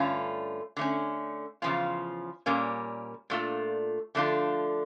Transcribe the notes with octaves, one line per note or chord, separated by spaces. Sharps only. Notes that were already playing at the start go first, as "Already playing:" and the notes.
Already playing: G2 D3 A3 C#4 F4
D3 A3 C#4
E2 C#3 F3 C#4 F4
A#2 G3 A#3 C#4
A#2 A3 D4 F4
D3 F3 A3 D4 F4